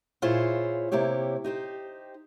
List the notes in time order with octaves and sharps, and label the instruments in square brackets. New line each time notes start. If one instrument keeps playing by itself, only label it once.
[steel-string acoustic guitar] A#2 E4 F4 G#4 C5 C#5
C3 A#3 E4 G4 C#5
D#4 G4 C5